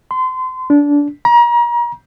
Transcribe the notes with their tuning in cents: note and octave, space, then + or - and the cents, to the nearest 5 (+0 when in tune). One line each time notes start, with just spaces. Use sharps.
C6 -30
D4 -20
A#5 +35